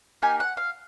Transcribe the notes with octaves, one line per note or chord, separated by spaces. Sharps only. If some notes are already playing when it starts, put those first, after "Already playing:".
A#3 D#4 G4 G#5
F#5
F5